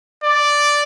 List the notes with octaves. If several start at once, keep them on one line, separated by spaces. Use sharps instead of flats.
D5